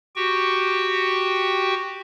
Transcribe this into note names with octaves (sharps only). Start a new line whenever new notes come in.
F#4 G4 G5 C#6